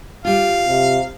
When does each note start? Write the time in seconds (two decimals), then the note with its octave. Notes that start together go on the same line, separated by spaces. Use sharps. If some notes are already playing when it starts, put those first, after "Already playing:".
0.25 G3 F4 F5
0.68 C3